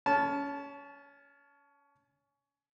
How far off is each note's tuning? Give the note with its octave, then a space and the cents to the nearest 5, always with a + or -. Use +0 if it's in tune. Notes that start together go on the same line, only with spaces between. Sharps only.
C#4 +20 A5 -20